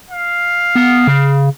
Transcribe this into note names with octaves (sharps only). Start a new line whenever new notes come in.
F5
B3
C#3